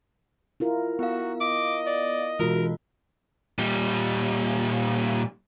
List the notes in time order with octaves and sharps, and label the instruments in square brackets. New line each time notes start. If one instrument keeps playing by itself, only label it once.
[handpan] E4 F4 A#4
[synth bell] B3 F5 [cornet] F#4
[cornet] D#5 [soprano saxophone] D6
[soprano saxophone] D5
[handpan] B2 G#3 [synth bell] E3 F4 F#4 [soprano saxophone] A#4
[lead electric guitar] A#2 G3